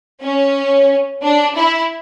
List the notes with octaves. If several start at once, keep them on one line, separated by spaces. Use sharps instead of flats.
C#4
D4
E4